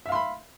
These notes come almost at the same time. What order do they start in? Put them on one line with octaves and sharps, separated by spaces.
E5 F5 C6 B5